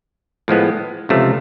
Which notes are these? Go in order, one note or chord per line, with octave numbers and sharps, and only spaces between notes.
A2 F3 G#3 B3
C#2 C3 F3 A3